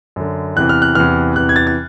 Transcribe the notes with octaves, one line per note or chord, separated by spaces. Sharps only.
F#2 D3
E2 C3 E3 F#6
F6
F#6
E2 C3 E3 F6
E2 C3 E3 F#6
G#6
A6
A6